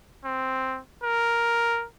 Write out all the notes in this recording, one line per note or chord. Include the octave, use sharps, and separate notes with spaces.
C4
A#4